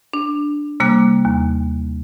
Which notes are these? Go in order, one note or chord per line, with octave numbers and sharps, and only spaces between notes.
D4
C3 G3 A#3 D6 F#6
D#2